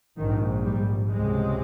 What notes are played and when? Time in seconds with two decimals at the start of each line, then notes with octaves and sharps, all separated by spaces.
0.17 A#1 G#2 D#3
0.64 G3
1.11 C#2 C3 G#3